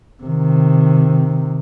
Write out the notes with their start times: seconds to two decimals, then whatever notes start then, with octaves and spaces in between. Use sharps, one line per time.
0.23 C3 D#3